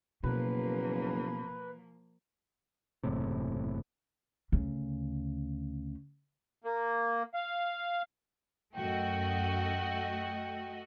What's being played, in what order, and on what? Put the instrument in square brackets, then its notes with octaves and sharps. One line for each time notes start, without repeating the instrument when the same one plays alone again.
[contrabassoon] F#1 [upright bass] B2 [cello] F3 A#3 [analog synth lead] B4
[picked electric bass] F#1 E2 A2 C3
[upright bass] D2 C#3
[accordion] A#3
F5
[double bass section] F#2 [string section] A3 F#4 D#5 [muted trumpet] G5